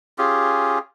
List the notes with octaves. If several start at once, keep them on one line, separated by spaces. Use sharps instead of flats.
C#4 F4 G4 G#4